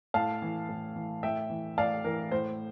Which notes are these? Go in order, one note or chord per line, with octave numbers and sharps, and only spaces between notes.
A2 F5 A5
E3
A2
E3
A2 E5 G5
E3
A2 D5 F5
E3 A#4
A2 C5